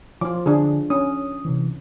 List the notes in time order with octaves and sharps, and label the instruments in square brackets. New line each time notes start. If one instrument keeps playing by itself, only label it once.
[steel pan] F3 F4 [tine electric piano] D6
[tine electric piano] D3 [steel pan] D4 G#4
[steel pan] C#4 [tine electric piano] D#6
[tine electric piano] C3 E3